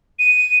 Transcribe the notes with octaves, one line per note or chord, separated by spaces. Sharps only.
D#7